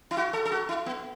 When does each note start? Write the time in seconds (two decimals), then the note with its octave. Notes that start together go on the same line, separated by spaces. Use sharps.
0.11 E4
0.17 F#4
0.33 A4
0.45 A4
0.52 F#4
0.69 E4
0.86 B3